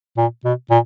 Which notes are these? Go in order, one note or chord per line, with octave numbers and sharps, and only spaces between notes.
A#2
B2
A#2